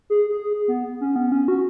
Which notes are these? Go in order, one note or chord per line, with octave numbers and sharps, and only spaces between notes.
G#4
G#4
B3
C#4
B3
C#4
F#4